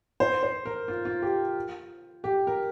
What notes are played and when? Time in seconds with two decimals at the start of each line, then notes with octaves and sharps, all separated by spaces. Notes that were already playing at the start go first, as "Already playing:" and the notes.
0.20 C5
0.43 C5
0.66 A#4
0.88 F4
1.05 F4
1.22 G4
2.24 G4
2.47 A#4